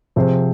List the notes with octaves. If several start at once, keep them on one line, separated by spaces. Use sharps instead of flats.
C3 F3 C4 G#4 C5